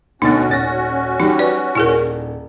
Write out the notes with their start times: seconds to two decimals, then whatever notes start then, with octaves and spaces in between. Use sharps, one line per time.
0.22 D2 B2 C#4 D#4 F#4 A6
0.49 D#1 A6 A#6
1.20 F#3 G3 D#4 G4
1.39 B4 D5
1.75 D#1 E4 G#4 A#4